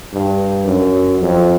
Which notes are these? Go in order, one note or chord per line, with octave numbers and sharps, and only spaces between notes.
G2
F#2
F2